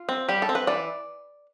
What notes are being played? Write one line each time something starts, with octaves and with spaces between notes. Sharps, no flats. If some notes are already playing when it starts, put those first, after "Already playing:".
Already playing: F4
C4
G3 G4
A4
C4
B4
E3 D5